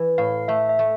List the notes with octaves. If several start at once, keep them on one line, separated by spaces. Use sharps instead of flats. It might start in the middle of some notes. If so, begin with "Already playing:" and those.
Already playing: E3
A2 F5
A3 E5
E5
A3